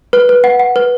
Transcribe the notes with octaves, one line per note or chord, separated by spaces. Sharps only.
B4
B4
F#5
F#5
B4